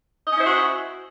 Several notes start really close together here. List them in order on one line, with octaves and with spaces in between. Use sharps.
D#5 C#4 E4 C5 F#4